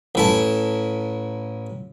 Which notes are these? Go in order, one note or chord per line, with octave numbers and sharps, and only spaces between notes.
A1 E4 A5